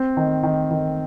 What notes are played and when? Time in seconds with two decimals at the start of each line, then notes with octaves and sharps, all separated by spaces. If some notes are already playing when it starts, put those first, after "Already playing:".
Already playing: C4
0.17 D#3
0.43 D#3
0.71 D#3